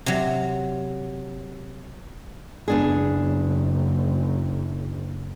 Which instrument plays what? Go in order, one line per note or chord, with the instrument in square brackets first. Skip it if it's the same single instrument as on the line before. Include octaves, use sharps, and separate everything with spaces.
[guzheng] C3 F#3
[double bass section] F#1 [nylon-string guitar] B3 D4 G#4